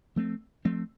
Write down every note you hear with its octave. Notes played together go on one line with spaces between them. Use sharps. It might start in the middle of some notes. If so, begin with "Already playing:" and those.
F3 A3 C4
F3 A3 C4